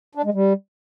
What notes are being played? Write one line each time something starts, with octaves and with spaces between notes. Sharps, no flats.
D4
G#3
G3